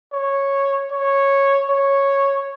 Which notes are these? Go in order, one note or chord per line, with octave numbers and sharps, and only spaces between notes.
C#5
C#5
C#5